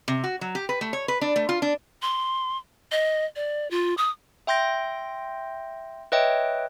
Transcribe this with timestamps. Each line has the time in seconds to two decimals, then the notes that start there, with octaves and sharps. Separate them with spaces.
0.08 C3
0.24 F#4
0.41 F#3
0.55 G4
0.69 B4
0.81 A3
0.93 C#5
1.08 B4
1.21 D4
1.36 A3
1.49 F4
1.62 D4
2.02 C6
2.92 D#5
3.36 D5
3.71 F4
3.98 D#6
4.47 E5 G5 C6 G6 A#6
6.12 B4 C#5 D#5 E5 G5